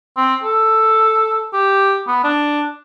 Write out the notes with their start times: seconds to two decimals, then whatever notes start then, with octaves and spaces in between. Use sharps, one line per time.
0.17 C4
0.43 A4
1.53 G4
2.07 B3
2.24 D4